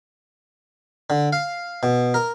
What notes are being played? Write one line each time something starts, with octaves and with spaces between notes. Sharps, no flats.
D3
F5
B2
A#4